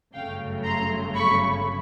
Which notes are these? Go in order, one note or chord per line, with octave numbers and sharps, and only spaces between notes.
G1 F#2 C#3 F#3 A3 F5 G5
A#5 C6
B5 C#6